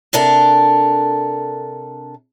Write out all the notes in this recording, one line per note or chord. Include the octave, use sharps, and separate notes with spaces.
C3 D4 A4 A#4